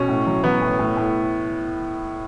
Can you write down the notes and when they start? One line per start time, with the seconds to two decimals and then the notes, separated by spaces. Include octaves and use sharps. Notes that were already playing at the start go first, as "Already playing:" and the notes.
Already playing: B2 C#4
0.08 A2
0.27 F#3
0.44 F#3 B3
0.62 A2
0.79 A2
0.97 A2